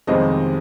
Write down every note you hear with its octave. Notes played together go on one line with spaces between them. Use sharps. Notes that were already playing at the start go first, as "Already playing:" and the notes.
G1 F2 C3 D#3 G#3 D#5